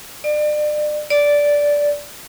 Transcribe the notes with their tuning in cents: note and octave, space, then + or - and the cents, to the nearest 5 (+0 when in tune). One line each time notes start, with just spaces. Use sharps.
D5 +35
D5 -10